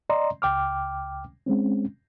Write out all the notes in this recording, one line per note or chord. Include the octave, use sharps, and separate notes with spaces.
D5 D#5 A#5 C6
C#2 G5 D6 F6
G#3 C4 C#4